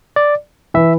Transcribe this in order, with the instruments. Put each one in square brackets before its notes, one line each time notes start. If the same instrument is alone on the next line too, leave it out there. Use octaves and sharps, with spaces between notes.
[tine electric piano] D5
[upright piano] E3 [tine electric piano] E5